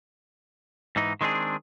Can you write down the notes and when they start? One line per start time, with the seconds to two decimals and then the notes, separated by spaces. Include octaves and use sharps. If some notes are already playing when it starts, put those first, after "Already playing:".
0.96 G#2 E3 D#4
1.21 D#3 G#3 C4 D4 G#4